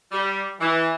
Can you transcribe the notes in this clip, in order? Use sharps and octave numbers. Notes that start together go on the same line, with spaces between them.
G3
E3